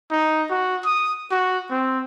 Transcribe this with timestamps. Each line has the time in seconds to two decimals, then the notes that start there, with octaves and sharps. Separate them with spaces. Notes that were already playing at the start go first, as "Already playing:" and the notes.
0.11 D#4
0.51 F#4
0.85 D#6
1.31 F#4
1.71 C4